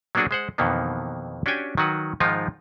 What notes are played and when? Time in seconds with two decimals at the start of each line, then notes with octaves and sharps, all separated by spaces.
0.15 F#3 A#3 B3 D4 F#4 G#4
0.31 G#3 C5 F#5
0.58 F2 B2 D#3 E3 A#3 B3
1.46 C#4 D4 F#4 G4 G5 G#5
1.77 D#3 F#3 F#4 B4
2.20 G#2 D#3 F3 G#3 D#4 F4